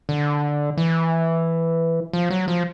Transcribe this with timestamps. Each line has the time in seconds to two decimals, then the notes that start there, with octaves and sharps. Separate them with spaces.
0.09 D3
0.77 E3
2.13 F3
2.31 F#3
2.48 F3